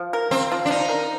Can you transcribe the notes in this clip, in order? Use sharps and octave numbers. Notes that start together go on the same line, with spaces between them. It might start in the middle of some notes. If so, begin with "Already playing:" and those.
Already playing: F3
A#4
F3 C4
F3
D4
F3 D#4
A#4